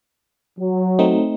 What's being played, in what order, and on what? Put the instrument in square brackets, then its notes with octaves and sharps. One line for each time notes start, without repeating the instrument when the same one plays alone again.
[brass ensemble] F#3
[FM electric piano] A3 C4 D#4